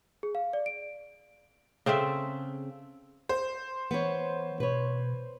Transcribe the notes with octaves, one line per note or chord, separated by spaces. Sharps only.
G#4
F5
D5
D7
C#3 C4 A4 E5
C5
E3 B3 C#5
B2 B4 C#5